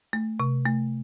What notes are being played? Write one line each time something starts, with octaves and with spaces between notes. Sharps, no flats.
A3
C3
A3